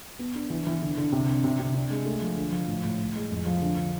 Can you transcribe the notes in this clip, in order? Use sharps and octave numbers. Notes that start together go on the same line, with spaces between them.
B3
D4
E3
E3
D3
D3
C3
D4
C3
C3
D4
G#3
A3
F3
D3
F3
A2
A2
A2
G#3
F2
F3
D3
D3